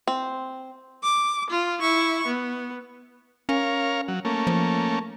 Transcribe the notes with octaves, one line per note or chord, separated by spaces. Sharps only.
C4
D6
F4
E4 C#6
B3
C#4 A#4 C#5 F5
F#3
A3 A#3 C#4
F3